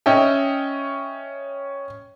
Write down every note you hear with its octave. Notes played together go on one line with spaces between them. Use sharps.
C#4 D#5 E5 G5